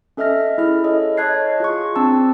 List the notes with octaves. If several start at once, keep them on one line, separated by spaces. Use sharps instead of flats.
C#4 A4 D#5 E5 F6 A#6
E4 G#4 F6
A4 C#5 D#5
C#5 D#5 A5 F#6 G#6 C7
F4 G#4 C#6
C4 D4 A5 E6